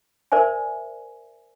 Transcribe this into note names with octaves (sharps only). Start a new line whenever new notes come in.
A#4 C5 D5 E5 G#5